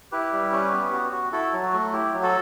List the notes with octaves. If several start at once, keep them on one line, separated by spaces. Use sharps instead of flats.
E4 G4 B4
G3
C#4
B3
F#4
F#4
E4 F#4 A4
F#3
F#4
A3
E4 G4
F#3
F#4 A4